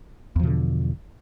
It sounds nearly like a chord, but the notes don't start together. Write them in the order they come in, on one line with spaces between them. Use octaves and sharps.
E2 F3 B2 D3